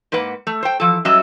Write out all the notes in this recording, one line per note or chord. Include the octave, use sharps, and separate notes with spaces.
G#2 A#3 B4 F#5
A3
C5 G5
E3 F3 A4
F#3 G3 C#4 F#4 D#5 E5